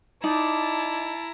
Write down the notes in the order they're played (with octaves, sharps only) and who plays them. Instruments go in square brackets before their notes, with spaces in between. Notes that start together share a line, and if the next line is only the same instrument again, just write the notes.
[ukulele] D#4 [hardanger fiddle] E4 A#5 [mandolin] D5 [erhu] A5